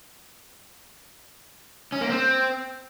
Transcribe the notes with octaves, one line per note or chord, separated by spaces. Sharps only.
C#4
A#3
C4